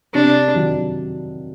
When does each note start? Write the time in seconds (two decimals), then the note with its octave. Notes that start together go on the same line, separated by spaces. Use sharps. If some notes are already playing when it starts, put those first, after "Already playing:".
0.14 C3 D4
0.55 D#3 F#3